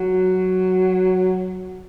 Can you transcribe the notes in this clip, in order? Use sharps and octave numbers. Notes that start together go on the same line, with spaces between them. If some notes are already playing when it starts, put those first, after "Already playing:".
Already playing: F#3